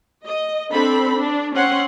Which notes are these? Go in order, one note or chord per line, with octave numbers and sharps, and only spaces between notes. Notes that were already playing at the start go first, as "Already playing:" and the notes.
D#5
C4 D4 A4 B5
D4
C4 C#4 F#5 C6